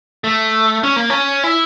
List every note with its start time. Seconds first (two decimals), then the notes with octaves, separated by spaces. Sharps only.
0.24 A3
0.83 C#4
0.96 A#3
1.10 C#4
1.44 E4